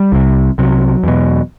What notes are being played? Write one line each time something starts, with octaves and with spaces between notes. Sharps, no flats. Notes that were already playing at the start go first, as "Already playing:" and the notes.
Already playing: G3
C2 C3
C2 C3 F#3
E2 B2